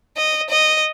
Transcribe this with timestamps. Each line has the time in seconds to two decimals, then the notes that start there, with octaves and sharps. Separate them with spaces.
0.17 D#5
0.50 D#5